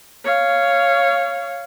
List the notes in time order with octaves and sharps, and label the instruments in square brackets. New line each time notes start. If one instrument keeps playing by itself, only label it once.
[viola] C#5 F5